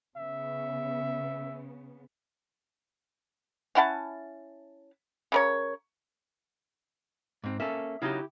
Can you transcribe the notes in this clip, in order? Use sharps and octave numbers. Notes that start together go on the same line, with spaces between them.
C#3 B3 E5
C#4 E4 F#5 A5
C#3 A#4 C#5
G#2 C4
A#3 C#4 A4 E5
C#3 F#3 D#4 E4 G4